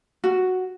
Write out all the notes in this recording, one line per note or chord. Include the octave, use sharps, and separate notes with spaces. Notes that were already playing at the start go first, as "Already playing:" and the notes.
F#4